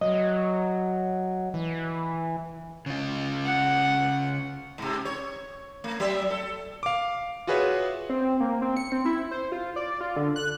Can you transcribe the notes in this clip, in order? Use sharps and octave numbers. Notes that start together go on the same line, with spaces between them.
F#3 D#5
E3
C#3 F4
F#5
G#2 C3
C#5
A3
F#3 E5
A4
F5 D6
F4 F#4 G#4 B4 C#5 E5
C4
A#3
C4
C#7
C4
E4
C5
F4
D5
F4
D3
F#6